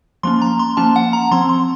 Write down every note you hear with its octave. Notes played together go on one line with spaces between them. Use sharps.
F3 A#3 C#4 C6
A#5
C6
F3 A#3 C#4 A5
F#5
A#5
F3 C4 C6
C6